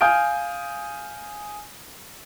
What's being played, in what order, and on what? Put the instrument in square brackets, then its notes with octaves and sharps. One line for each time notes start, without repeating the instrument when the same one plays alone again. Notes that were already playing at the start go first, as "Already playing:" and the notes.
[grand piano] F5 G#5 D#6 F6 G6 D7